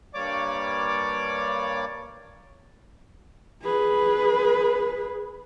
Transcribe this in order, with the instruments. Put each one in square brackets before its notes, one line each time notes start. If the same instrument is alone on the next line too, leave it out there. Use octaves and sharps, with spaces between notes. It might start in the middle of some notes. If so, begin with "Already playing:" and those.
[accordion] G2 G3 A#3 C#5 D5 D6
[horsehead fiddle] G#4 B4